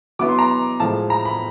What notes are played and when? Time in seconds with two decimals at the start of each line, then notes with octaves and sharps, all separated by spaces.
0.19 F#3 B3 E4 D6
0.29 C6
0.39 A#5
0.80 A2 F3 G#3 A5
1.10 A#5
1.25 B5